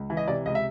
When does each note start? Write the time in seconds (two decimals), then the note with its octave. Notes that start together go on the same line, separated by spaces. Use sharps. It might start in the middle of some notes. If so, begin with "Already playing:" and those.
Already playing: C#2
0.10 E3
0.17 D#5
0.28 C3 D5
0.45 C#2 D#5
0.55 E5